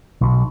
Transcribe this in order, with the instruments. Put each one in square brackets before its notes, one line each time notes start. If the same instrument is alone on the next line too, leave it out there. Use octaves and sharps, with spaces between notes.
[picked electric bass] B1